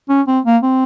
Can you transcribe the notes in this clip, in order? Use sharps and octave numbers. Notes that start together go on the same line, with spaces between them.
C#4
C4
A#3
C4